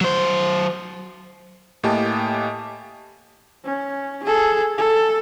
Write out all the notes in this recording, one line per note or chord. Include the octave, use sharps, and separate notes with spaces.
F#3 C5
A2 A#3 G4 D#5 G#5 A5
C#4
G#4 A4
A4